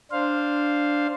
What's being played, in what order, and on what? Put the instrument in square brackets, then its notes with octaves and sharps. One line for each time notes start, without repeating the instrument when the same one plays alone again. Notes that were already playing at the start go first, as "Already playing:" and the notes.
[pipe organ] D4 C5 F5